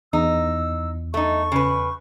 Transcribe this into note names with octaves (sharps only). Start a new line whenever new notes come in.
E2 D#4 E6
A3 D#4 C#6
C#3 B4